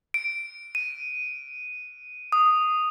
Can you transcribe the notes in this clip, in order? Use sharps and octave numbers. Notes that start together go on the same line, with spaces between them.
D7
D#7
D#6